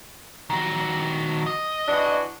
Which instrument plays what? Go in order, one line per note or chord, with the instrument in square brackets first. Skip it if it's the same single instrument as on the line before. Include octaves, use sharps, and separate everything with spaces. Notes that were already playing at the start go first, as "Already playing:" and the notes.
[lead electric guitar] D#3 F#4
D#5
[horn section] E3 D4 F#4